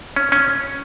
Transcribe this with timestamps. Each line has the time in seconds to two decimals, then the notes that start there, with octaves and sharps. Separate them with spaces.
0.16 C#4
0.32 C#4